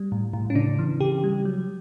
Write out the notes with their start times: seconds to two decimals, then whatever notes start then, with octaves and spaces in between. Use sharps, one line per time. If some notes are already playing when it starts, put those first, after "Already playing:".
Already playing: G3
0.12 A2
0.33 A2
0.50 C#4
0.55 C#3 D4
0.79 E3
1.00 C#3 G4
1.24 G3
1.45 F#3